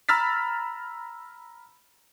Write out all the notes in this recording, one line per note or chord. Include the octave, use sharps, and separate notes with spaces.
A#5 B5 E6 F6 A6 B6